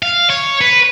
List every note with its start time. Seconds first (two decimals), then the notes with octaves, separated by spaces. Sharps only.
0.03 F5
0.30 C#5
0.61 B4